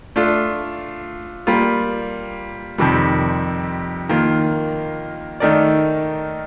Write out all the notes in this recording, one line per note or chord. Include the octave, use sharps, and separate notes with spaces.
A3 D4 F4
G3 A#3 F4
F2 C3 D#3 G3
D#3 A#3 F4
D#3 A3 D#4 A#4 D5